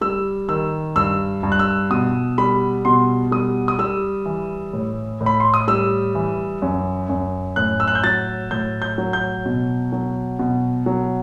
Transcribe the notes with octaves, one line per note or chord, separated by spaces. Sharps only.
G3 E6
D#3 E6
G2 E6
G2
F#6
E6
B2 D#6
G3 B5
B2 C6
G3 D#6
D#6
G3 E6
E3
A2
A2
B5
C6
D#6
G3 E6
E3
F#2
F#2
A2 F#6
E6
F#6
G6
F#3 A6
A2 G6
G6
F#3
G6
B2
F#3
B2
F#3